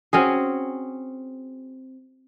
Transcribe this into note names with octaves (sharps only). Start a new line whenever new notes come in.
C4 C#4 F#4 G#4